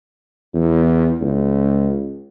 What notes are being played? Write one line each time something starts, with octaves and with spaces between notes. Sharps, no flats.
E2
C#2